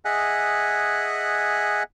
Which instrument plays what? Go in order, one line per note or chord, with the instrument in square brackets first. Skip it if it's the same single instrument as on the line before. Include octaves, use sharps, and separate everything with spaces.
[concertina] G#4 D#5 E5 F#5 G#5 F#6